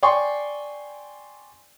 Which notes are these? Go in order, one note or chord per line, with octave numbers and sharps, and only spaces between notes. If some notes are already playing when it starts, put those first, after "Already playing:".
D5 G5 G#5 C6 C#6